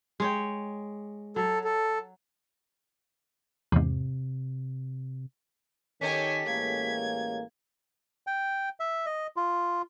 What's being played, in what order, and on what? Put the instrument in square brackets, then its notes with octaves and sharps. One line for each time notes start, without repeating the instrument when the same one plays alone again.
[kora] G#3 C#5 G5
[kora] F#3 [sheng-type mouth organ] A4
[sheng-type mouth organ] A4
[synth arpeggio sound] E2 G#2 [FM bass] C3
[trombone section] D#3 [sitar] C#4 G4 A4 [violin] C#5 G#5 [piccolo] B6
[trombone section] A1 G#3 A#3 [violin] G#6
[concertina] G5
E5
D#5
F4